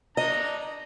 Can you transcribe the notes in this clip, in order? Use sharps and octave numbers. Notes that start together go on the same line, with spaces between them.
D4 D#5 A#5